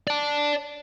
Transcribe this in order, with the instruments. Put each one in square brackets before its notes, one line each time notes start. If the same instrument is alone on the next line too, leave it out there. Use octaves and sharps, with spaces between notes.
[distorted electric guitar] D5 A5